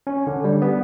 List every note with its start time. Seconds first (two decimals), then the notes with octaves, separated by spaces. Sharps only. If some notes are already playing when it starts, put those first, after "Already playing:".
0.07 C#4
0.27 D3
0.44 G3
0.62 B3